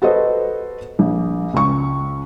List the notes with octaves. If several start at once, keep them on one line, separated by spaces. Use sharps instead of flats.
F#4 A4 B4 C5 D#5
A#1
C#2 C#6